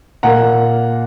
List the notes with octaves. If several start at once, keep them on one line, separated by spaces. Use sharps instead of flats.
A#2 A#3 F#5 A#5